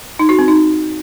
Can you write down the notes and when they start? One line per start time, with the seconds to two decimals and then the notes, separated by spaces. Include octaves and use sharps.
0.19 D#4
0.29 F#4
0.39 C4
0.48 D#4